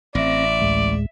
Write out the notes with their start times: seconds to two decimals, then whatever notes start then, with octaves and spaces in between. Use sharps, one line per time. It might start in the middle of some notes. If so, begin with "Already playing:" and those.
0.15 A1 C4 D5 E5 A#6
0.62 D2 A2 G#3